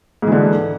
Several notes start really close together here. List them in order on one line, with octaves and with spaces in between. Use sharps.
G#2 E3 D3